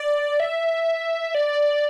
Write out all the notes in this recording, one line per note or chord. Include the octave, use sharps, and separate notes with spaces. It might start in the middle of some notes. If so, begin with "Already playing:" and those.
Already playing: D5
E5
D5